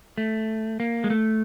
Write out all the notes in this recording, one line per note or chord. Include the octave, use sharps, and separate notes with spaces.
A3
A#3
G#3
A3